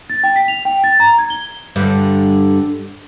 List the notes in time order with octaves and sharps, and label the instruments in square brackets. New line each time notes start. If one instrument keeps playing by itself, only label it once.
[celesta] A6
G5
B6
F7
G5
A6
A#5
G#6
G7
[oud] G2 D3